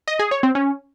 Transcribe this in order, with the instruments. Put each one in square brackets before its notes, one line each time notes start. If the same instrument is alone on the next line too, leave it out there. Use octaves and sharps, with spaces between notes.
[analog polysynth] D#5
G#4
C#5
C4
C#4